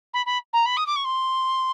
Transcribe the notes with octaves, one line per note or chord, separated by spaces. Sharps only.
B5
B5
A#5
B5
D#6
D6
C#6
C6